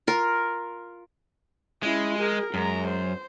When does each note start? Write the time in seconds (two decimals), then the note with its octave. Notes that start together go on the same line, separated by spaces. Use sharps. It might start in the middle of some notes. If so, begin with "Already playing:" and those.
0.07 F4 A#4
1.83 G#3 C#4 E4
2.19 G#4 A#4
2.54 F#2 G#3 A#5
2.88 C5